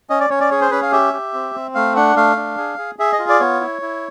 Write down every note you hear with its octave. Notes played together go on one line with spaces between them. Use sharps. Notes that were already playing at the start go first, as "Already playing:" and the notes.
C#4 D#5
D5
C#4 C#5
D5
G#4 C#5
C5
C#4 B4
F5
G4 E5
G4
C4
C4
A3 F5
D4 F#5
A3 F5
D4
G#4
G#4
G#4 E5
D#5
F4
D5
B3 C#5
E4
E4